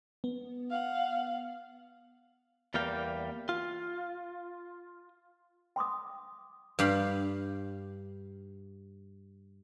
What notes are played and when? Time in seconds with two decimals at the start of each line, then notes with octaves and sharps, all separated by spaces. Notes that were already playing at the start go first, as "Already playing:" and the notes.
0.24 B3
0.70 F5 F#5
2.74 E2 G3 A#3 F5 G5
3.49 F4
5.76 G5 C6 D6 D#6
6.79 G2 G4 F5 B5